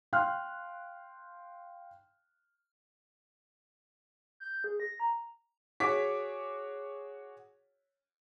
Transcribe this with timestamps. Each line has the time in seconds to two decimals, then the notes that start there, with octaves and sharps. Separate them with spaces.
0.13 F5 G5 C6 F6 F#6
4.40 G6
4.64 G#4
4.80 A#6
5.00 A#5
5.80 F#4 G#4 C#5 D6 B6